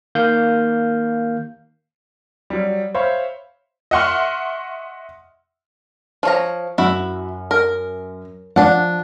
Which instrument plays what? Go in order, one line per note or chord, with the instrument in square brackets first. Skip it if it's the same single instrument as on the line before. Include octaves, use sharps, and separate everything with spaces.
[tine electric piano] D#3 A#3 F5 G6
[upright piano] F#3 G3
C5 C#5 E5 F5 B5
[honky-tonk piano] D#5 E5 F#5 C6 C#6 F6
[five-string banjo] F3 C#5 A#5
[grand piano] F#2 [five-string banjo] E4 F#4
[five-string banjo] A#4
[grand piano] F3 [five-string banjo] D4 F#5